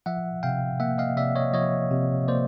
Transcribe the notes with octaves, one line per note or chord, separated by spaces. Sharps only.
F3 E5 F#5
C3 F5 G5
A#3 E5 F#5
D#5 F5
C3 D5 E5
C#5 D#5
F3 C#5 D#5
C3
A#3 C5 D5